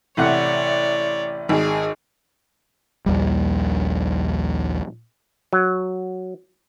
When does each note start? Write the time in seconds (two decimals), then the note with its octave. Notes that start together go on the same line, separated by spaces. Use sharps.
0.17 A1 C3 C#5 D5 F#5
1.49 G#1 G#4 G#5
3.06 A#1 D#2 G3
5.53 F#3